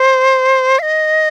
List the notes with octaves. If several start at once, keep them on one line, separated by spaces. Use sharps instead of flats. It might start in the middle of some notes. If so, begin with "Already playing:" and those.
Already playing: C5
F5
D#5